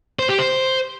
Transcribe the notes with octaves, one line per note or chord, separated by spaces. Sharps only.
C5
G4
C5